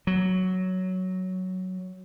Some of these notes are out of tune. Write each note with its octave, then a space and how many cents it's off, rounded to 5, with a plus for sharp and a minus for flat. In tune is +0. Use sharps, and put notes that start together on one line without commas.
F#3 +5